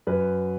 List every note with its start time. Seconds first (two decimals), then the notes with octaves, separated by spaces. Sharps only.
0.07 F#2 B4